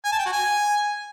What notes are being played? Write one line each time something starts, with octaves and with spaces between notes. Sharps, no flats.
G#5
A5
G5
F#4
G#5